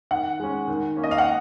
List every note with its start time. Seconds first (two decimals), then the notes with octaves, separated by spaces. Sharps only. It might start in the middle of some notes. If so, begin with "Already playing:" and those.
0.11 D#3 F#5
0.40 G#3 C#4
0.68 D#3
0.97 A#3 C#4
1.04 D#5
1.11 F5
1.18 F#5